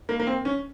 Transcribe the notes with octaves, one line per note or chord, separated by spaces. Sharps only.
A#3
A#3
C4
C#4